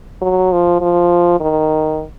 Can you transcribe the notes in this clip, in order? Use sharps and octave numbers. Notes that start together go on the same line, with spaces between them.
F#3
F3
F3
D#3